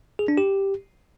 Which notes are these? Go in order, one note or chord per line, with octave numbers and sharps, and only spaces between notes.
G#4
D4
G4